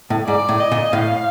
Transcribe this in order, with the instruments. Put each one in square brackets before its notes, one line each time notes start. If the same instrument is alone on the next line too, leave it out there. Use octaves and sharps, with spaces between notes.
[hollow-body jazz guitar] A2
[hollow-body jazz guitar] G#2 [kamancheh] D5
[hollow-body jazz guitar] A2
[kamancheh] D#5
[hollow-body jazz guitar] A#2
[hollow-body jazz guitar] A2 [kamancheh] F5